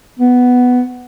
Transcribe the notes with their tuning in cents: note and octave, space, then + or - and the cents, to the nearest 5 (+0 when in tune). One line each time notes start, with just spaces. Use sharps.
B3 +5